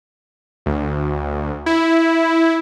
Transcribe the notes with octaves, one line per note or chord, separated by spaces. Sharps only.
D2
E4